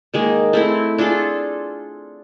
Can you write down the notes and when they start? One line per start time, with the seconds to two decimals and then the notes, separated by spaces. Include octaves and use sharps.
0.14 D#3 G#3 A#3
0.53 A3 C4 E4
0.98 D4 F4 G#4 A4